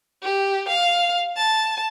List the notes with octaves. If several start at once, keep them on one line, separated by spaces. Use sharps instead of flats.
G4
F5
A5